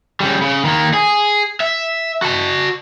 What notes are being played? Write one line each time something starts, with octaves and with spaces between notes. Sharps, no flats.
C#3 G3
C#3
D#3 A#3
G#4
E5
F#4 A5